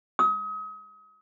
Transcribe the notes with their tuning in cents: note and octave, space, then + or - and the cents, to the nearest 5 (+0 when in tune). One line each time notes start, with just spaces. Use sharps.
D#6 +35